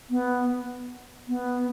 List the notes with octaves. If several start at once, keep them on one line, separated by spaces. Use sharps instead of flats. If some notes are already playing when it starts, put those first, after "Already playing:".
B3
B3